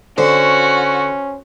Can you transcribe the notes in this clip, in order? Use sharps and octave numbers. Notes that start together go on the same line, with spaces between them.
D3 C#4 F#4 C5